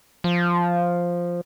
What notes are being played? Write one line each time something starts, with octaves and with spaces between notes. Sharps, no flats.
F3